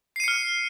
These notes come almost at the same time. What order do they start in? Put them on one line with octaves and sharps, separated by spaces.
C7 D#7 C#7 F6